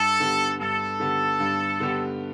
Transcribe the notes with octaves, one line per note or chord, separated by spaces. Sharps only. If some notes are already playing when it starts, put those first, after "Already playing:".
Already playing: G2 A4
D3 B3 G4
G2 A4
D3 B3 G4
G2
D3 B3 G4